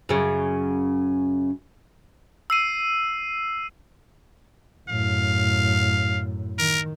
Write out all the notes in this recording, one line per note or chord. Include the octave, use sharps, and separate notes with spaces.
F#2 C#3
E6 C7 D#7
F#2 A2 F5
D#3 A#4